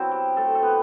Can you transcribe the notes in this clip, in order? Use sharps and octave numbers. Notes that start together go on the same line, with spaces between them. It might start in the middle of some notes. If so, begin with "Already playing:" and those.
Already playing: F#3 B3 C4 E4 C5
G4
A3 A4
A4
B3 B4